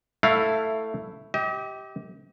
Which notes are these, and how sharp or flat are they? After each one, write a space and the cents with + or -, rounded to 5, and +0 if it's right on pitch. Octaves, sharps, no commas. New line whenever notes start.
A3 +10 E4 +0 F5 +10
G4 -10 D#5 +40